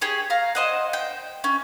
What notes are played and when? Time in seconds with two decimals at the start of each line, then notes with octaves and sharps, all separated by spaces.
0.01 G4 G#4 C#5
0.30 F5 A#5
0.55 C5 D#5 F#5
0.93 G5
1.44 C#4